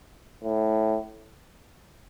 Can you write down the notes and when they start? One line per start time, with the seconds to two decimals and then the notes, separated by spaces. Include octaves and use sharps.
0.44 A2